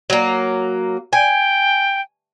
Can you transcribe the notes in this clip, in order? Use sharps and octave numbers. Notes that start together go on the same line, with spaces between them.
F#3 A#3
G5 G#5